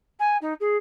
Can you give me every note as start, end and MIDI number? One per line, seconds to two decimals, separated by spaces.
0.19 0.37 80
0.41 0.53 63
0.60 0.77 68